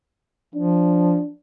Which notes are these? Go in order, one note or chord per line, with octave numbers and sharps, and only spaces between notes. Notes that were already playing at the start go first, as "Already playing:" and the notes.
F3 D4